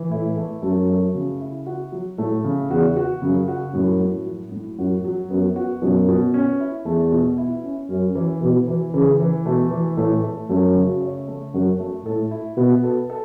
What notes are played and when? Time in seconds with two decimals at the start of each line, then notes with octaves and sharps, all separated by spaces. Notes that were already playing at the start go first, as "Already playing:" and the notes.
Already playing: E3
0.11 A2 E4
0.37 A3
0.62 F#2 A3
0.89 A3
1.15 C#3
1.41 E4
1.66 F#4
1.92 F#3
2.18 A2 A3
2.44 C#3
2.70 E2 F#4
2.96 F#4
3.22 F#2 C#3
3.48 F#4
3.74 F#2 A2
4.00 A2
4.26 F#3
4.52 A2
4.78 F#2 F#4
5.04 F#3
5.30 F#2 B3
5.56 F#4
5.82 F#2 B2
6.08 B2
6.34 C#4
6.60 E4
6.85 E2 A3
7.12 B2
7.38 E4
7.63 C#4
7.89 F#2 C#4
8.15 E3
8.42 B2 E3
8.68 E3
8.94 C#3 E3
9.20 E3
9.45 B2 A3
9.71 E3
9.97 A2 A3
10.24 A3
10.49 F#2 A3
10.75 C#3
11.01 C#5
11.28 A3
11.54 F#2 F#4
11.79 A3
12.05 A2 A4
12.31 E4
12.57 B2 B3
12.83 A4
13.10 A4